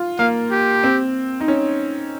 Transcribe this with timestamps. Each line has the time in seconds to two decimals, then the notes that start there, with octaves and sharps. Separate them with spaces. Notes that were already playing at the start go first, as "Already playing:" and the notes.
Already playing: F4
0.18 A#3 F5
0.51 G4
0.84 C4
1.40 D#4
1.48 C#4